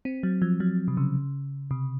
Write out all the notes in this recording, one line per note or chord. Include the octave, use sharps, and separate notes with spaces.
C4
F#3
F3
F#3
C3
C#3
C3